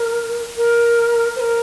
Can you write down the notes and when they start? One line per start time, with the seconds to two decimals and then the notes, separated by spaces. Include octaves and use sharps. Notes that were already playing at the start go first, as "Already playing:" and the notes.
Already playing: A#4
0.57 A#4
1.36 C5
1.40 A#4